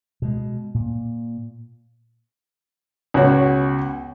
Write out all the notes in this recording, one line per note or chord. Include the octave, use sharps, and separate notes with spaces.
B2 G#3
A#2
C#2 B2 B3 F#4 C#5